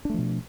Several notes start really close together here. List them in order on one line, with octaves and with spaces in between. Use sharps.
D4 A3 F3 B2